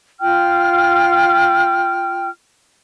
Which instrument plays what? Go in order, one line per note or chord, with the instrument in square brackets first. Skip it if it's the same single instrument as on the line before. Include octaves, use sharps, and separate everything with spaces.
[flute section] F4 G5 F6